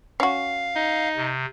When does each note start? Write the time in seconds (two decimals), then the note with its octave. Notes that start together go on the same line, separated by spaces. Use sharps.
0.20 C#4 F#4 F5
0.76 D#4
1.16 C3